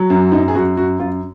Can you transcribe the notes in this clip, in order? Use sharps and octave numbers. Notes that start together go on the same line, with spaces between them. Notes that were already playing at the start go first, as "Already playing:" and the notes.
Already playing: F#3
F#2
F#2 D#4
G#4
F#2 F#4
F#2 F#4
F#2 F4